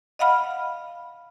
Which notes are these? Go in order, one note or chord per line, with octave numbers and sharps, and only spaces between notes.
D#5 F5 F#5 B5 F6